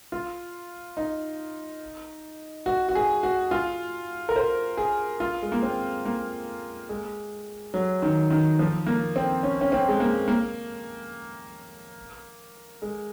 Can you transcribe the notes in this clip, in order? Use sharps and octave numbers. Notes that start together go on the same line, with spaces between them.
F4
D#4
F#4
F#4
G#4
F#4
F4
A#4
C5
G#4
F4
G#3
A#3
C4
A#3
G#3
F#3
D#3
D#3
F3
A#3
C4
C#4
C#4
C4
G#3
A#3
A#3
G#3